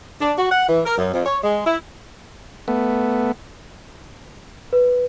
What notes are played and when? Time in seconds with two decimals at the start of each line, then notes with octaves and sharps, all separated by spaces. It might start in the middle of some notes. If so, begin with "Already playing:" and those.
0.21 D4
0.38 F#4
0.51 F#5
0.69 E3
0.86 A#4
0.98 F#2
1.14 F2
1.26 C#5
1.44 G#3
1.66 E4
2.68 A3 B3
4.73 B4